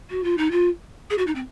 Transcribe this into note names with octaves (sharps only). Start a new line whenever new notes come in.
F#4
F4
D#4
F4
G#4
F#4
D#4
C4